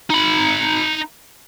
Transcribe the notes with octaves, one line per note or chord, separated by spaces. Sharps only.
D#4 B5